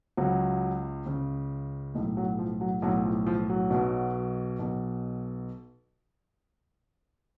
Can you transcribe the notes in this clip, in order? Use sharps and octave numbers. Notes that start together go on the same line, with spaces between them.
C#2 C#3 F#3
C#2 C#3
B1 A2 G#3
F#3
F3
F#3
B1 A2 F#3
F3
F3
F#3
B1 B2
B1 B2